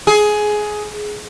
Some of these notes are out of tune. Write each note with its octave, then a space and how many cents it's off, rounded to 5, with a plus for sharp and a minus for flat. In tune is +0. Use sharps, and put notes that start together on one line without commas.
G#4 +15